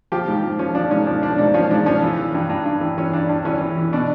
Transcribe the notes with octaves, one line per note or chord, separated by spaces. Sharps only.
F3 G4
G#2
F3
F3 C#4
F3 D4
G#2 C#4
F3 D4
F3 D4
G#2 D4
F3 C#4
G#2 D4
F3 C#4
E3
E3
G2
G2
G2
E3
E3 C#4
G2 D4
G2 D4
E3 C#4
E3
E3
B2 D4